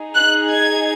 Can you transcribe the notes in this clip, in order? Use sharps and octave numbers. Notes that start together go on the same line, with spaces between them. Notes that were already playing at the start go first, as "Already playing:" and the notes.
Already playing: D#4 G#4
F#6
G#6